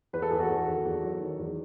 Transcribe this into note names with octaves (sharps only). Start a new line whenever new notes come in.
E2 B4
A4
E2 G#4
F#4 A4
E2
D#3
E2
F#3
D#3
E2